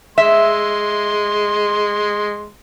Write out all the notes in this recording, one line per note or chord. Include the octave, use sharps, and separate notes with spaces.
G#3 E5 C6